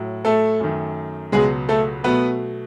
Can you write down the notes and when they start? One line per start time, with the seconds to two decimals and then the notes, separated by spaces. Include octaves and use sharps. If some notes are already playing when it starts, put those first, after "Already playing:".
Already playing: A2 F#3
0.25 A3 A4
0.60 F#2 D#3 A3
1.32 C#2 B2 F#3 G#3 B3 G#4
1.69 A3 A4
2.04 B2 F#3 A3 B3 B4